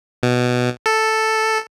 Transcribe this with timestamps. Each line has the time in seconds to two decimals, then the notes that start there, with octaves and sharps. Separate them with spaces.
0.23 B2
0.86 A4